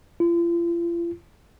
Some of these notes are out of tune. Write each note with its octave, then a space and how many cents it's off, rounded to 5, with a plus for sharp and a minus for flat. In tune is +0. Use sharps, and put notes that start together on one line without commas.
F4 -40